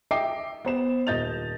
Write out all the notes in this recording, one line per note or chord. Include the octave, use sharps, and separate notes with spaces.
D#5 E5 G5 D6 C7
B3 C5 E7
D#1 D#5 G6 A6 F7